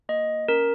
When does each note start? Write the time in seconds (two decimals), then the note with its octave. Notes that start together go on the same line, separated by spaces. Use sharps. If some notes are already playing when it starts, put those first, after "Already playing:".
0.09 A#3 D#5
0.48 C#4 A#4